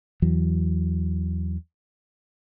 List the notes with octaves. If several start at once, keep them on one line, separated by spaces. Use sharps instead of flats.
E2 E3 F#3